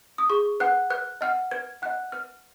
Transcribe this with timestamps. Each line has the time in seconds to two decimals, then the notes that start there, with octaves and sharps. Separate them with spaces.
0.18 D#6
0.30 G#4 C#6
0.60 B4 F#5 F#6
0.90 B4 F#6
1.21 D#5 F#5 F6
1.51 B4 G#6
1.82 D#5 F#5 F#6
2.12 B4 F6